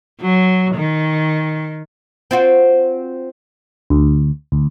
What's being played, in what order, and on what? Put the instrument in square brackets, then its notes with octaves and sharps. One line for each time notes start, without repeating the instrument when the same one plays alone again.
[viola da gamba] F#3
D#3
[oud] C4 F4 F#4
[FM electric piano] D2
D2